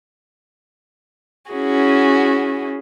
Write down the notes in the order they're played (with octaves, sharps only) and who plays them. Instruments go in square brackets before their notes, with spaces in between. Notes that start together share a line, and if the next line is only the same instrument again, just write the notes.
[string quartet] C#4 E4 F#4 G#4